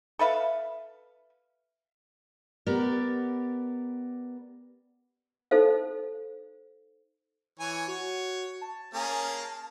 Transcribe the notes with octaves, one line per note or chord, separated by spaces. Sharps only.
A4 B4 E5 F5
B3 G4 A#4 D5
D#4 A4 C5 F5
E3 C#5 G#5
F#4 C#5
A5
A#3 C#4 G#4